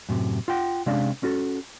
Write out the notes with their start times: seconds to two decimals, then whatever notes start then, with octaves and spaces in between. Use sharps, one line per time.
0.09 F#2 A2 C3
0.48 F4 F#5 G5
0.86 C3 G#3 C#4 D4 D5 F5
1.23 C#4 F#4 A4